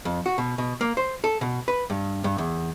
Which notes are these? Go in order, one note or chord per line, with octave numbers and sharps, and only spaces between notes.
F2
F#4
B2
B2
A#3
C5
A4
B2
B4
G2
G2
E2